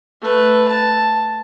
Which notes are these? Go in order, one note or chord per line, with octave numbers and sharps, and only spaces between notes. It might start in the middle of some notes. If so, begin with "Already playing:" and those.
A3 B4
A5